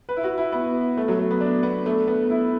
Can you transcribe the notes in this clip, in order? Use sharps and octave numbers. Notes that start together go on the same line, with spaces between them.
B4
E4
F#4
E4
B3
A3
F#3
A3
B3
D4
B3
A3
B3
E4